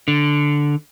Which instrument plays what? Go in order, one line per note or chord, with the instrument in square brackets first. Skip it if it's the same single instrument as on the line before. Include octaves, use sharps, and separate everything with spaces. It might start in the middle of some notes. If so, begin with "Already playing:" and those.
[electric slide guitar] D3